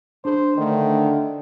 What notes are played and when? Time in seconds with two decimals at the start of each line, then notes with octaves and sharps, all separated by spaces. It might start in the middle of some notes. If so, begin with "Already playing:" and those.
0.25 D4 G#4 C5 B5
0.57 D3 D#3 A3